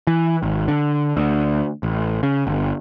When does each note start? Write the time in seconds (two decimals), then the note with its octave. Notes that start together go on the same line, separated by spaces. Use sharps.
0.07 E3
0.43 G#1
0.68 D3
1.17 D2
1.83 A1
2.23 C#3
2.47 G1